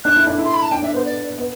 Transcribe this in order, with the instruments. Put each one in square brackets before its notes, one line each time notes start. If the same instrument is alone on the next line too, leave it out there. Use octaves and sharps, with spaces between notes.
[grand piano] D4 [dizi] F#6
[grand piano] E4
D4
E4
[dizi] C6
B5
A5
[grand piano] D4 [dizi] G5
[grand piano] D4 [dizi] E5
[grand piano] B3 [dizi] C5
[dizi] D5
[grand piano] B3